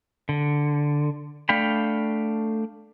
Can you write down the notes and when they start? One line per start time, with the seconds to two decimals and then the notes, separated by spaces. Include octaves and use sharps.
0.29 D3
1.49 A3 D4 F5 G5 B5